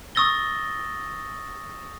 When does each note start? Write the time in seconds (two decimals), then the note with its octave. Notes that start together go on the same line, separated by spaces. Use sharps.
0.15 C#6 D#6 E6 A6 A#6 G7